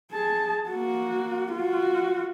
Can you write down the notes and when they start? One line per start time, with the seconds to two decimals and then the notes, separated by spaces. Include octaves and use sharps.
0.12 G#4 A5
0.69 A#3 F#4
1.53 F4 F#4